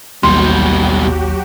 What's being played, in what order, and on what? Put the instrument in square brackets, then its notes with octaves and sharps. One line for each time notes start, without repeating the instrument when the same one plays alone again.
[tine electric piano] A1 D#2 [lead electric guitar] B2 G3 [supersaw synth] F#3 F#4 G4 [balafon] C6